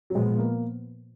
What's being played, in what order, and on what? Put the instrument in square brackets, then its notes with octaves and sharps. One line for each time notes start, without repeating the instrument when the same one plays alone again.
[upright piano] F#3
[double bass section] A#2 F3 B3 [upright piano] G#3
[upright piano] A#3